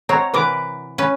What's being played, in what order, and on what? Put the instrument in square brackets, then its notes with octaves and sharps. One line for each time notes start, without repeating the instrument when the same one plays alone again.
[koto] C4 F#4 [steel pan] C#5 A#5
[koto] C3 E3 A#4 [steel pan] B4 D6
[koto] C#4 B4